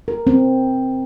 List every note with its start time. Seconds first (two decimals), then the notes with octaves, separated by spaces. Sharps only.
0.08 A#4
0.27 C4